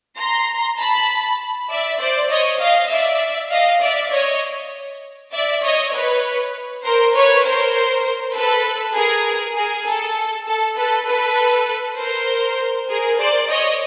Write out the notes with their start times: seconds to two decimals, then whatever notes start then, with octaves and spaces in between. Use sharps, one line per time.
0.19 A#5 C6
0.79 A5 B5
1.70 D5 E5
2.00 C5 D5
2.30 C#5 D#5
2.60 D#5 F5
2.91 D5 E5
3.51 D#5 F5
3.81 D5 E5
4.12 C#5 D#5
5.32 D5 E5
5.63 C#5 D#5
5.93 B4 C#5
6.84 A#4 C5
7.15 B4 C#5
7.44 A#4 C5
8.35 A4 B4
8.95 G#4 A#4
9.56 G#4 A#4
9.86 A4
10.47 A4
10.77 A4 B4
11.07 A4 B4
11.98 A#4 C5
12.89 G#4 A#4
13.19 C5 D5
13.49 C#5 D#5